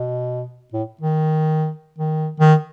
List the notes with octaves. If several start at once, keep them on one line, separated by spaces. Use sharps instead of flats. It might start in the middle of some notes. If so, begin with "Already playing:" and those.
Already playing: B2
A2
D#3
D#3
D#3